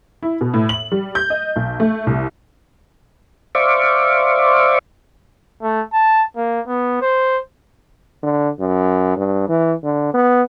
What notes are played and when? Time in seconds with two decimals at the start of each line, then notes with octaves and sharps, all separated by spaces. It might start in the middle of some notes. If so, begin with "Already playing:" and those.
0.23 E4
0.41 B2
0.54 A2
0.69 F#7
0.92 G3
1.15 G6
1.30 D#5
1.56 B1
1.80 A3
2.07 C2
3.55 C5 D5 E5 F5 C#6 D6
5.63 A3
5.93 A5
6.36 A#3
6.67 B3
7.01 C5
8.23 D3
8.60 F#2
9.17 G2
9.49 E3
9.84 D3
10.14 B3